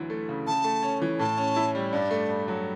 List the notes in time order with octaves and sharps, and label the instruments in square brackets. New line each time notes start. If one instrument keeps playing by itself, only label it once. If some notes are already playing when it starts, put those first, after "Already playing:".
Already playing: [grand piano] D2 E3 F#3
A3
C#3
[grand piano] C#3 [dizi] A5
[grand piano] A3
C#4
E3
[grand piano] A2 [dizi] A5
[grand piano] C#4
E4
G3
[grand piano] G2 [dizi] D5
[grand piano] A3
G2
F#3